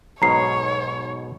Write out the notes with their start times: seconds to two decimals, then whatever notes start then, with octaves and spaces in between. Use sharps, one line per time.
0.22 B1 G#2 B2 C#5 A#5 C7